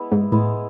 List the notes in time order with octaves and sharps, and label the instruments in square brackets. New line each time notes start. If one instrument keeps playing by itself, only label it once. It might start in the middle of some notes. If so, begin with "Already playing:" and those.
Already playing: [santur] G#3 B3 E4
[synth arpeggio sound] G#2
[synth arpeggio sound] A2 [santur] G#3 B3 E4